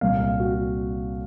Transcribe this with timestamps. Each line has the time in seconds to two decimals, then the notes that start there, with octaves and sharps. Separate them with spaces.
0.01 C2 A#2 F5
0.20 F5
0.40 F#4